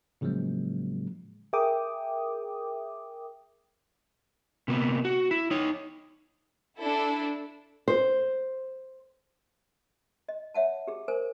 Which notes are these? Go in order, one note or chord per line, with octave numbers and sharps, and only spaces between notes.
A2 C#3 F3 F#3 G#3 A#3
G#4 A#4 E5 G5 D6 D#6
C3 A#3 B3
F#4
E4
D#4 C#5
D4 E4 A4
C5
D#5
C#5 E5 F#5 A5
G4 G#4
A#4 C5 G#5